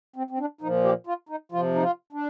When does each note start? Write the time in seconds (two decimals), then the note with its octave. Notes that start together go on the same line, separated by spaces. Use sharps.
0.16 C4
0.30 C4
0.39 D4
0.61 A#2 F3 D#4
0.84 G4
1.07 F4
1.29 D#4
1.52 C3 F3 F4
1.75 D#4
1.82 F4
2.13 D4